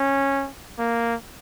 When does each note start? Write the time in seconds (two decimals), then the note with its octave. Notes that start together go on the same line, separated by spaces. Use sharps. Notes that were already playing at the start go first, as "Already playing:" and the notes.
Already playing: C#4
0.79 A#3